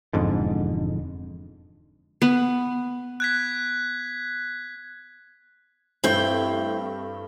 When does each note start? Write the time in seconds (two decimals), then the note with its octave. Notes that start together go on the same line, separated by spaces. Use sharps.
0.13 E1 F2 G#2 D3
2.22 B3
3.20 F#6 G#6 B6
6.04 G2 A3 C4 E4 G5 G6